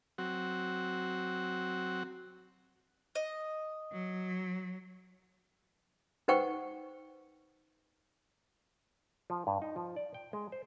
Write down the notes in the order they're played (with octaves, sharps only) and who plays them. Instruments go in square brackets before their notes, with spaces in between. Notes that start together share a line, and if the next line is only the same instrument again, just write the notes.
[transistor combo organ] F#3 C4 F#4
[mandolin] D#5
[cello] F#3
[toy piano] D#4 B4 C5 F#5 G5 C#6
[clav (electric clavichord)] F3
G2
D#4
F3
D5
G5
G#3
C5